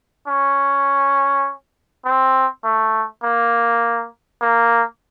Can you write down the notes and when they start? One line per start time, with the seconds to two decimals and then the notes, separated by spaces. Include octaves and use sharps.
0.27 C#4
2.05 C4
2.64 A3
3.23 A#3
4.41 A#3